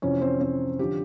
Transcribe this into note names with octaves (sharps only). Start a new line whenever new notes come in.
F2 C3 E3 C#4 C#5
C4 C5
C4 C5
D3 F3 G4